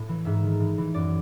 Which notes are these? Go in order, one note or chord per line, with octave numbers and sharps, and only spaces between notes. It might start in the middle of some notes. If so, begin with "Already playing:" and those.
Already playing: A2
E3
G#2 E5
D#3
A2
E3
F#2 D5